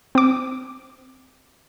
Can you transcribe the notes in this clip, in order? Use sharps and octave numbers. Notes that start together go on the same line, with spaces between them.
C4 D6